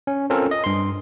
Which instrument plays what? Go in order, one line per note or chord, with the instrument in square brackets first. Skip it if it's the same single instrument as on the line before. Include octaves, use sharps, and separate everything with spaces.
[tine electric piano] C#4
C4 C#4 F4 A4 A#4
D#5
G2 C6